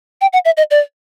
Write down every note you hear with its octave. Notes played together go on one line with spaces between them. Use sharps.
G5
F#5
E5
D#5
D5